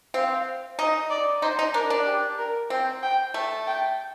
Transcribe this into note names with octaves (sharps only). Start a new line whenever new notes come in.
C4 F5
D#4 D#5
D5
D#4 C5
D#4
D4 A#4
D4
G4
A#4
C4 G5
G5
A3 A5
G5